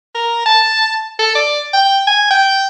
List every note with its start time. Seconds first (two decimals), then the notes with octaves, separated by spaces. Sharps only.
0.15 A#4
0.46 A5
1.19 A4
1.35 D5
1.73 G5
2.07 G#5
2.30 G5